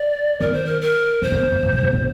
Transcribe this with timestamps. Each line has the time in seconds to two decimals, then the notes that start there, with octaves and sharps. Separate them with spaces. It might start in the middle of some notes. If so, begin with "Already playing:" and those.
Already playing: D5
0.40 D#3 A#4
0.53 C5
0.66 A#4
0.81 A#4
1.22 D#3 C5
1.32 D3
1.52 G2
1.63 G2
1.72 A2
1.83 A#2
1.93 D3